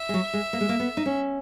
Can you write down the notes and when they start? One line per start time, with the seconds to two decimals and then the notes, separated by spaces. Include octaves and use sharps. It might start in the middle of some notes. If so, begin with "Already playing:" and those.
Already playing: E5
0.09 G#3
0.14 F#3
0.33 G#3
0.53 A#3
0.60 G#3
0.69 A#3
0.80 B3
0.97 D#4
1.06 C#4